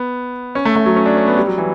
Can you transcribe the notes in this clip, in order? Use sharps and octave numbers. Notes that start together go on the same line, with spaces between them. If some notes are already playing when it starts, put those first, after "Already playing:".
Already playing: B3
C#4
A3
A3
F#3
C#4
D4
C#4
B3
G3
F#3
E3